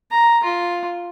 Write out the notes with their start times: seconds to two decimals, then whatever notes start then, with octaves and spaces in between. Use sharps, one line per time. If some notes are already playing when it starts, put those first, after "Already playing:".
0.11 A#5
0.44 F4